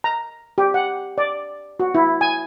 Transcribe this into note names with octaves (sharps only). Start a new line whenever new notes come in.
A#5
G4
F#5
D5
F#4
E4
G#5